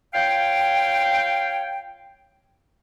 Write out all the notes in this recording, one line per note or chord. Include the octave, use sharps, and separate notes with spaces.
F4 C#5 F5 G5